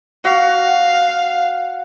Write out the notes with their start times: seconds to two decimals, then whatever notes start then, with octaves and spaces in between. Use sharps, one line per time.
0.25 F#4 F5